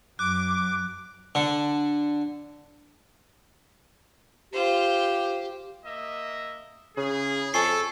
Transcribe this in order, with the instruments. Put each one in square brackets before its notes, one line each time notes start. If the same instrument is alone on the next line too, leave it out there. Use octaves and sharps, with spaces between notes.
[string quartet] F#2 [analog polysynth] D6 [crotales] F#6
[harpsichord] D3
[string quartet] F4 C5 [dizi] G4
[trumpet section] A#3 D#5 E5
[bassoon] C#3 [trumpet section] E4 G#4
[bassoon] F2 [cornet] A4 [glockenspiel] G#5 C#6 C7